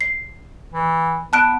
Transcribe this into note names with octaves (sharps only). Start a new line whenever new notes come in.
C7
E3
B3 A5 F#6 D7